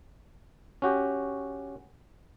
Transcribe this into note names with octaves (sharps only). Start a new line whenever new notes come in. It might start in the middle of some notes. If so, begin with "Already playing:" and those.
C#4 F#4 G4